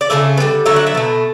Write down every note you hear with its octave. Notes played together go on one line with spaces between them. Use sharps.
D5
C#3 E3 A3 E5
B3
D3 G3
D3 F#3 A3 E5
F#5
E5
B2 A3